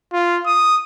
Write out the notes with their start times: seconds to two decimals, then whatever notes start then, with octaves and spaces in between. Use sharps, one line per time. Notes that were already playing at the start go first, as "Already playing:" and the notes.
0.13 F4
0.46 D#6